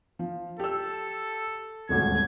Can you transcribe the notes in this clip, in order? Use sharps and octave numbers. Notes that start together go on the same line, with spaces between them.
F3
G4 A4 E6
D#1 G#1 D2 G#6